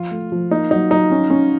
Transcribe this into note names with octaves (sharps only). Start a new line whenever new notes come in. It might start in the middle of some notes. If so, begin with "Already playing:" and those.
Already playing: F3 F4
A3
F3
A#3 D#4
F#3 D#4
F#3 D#4
C#4
C#4